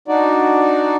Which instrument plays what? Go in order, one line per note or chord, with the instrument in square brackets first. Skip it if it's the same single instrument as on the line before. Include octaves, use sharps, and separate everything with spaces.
[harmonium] D4 D#4 F#4 D5